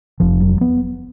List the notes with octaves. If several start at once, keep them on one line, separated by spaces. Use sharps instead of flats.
F1 F3
F#3
B3